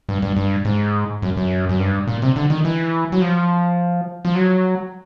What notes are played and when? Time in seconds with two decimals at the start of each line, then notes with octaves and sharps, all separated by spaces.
0.09 G2
0.22 G2
0.37 G2
0.65 G#2
1.22 F#2
1.37 F#2
1.69 F#2
1.79 G2
2.07 A#2
2.22 C3
2.36 D3
2.50 D#3
2.65 E3
3.12 F#3
3.21 F3
4.25 F3
4.35 F#3